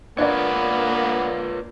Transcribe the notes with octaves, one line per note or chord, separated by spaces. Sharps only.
A#3 B3 D4 F4 B4 C#5 D5